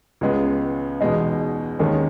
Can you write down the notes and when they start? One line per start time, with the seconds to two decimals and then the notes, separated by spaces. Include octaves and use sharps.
0.21 C#2 C#3 G#3 B3
1.01 E2 B2 G#3 D#4
1.79 D#2 D#3 G#3 C#4